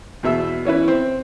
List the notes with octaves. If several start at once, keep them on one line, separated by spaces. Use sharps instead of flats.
E2 B2 E5 E6
E3 C#4 E4 B4
C4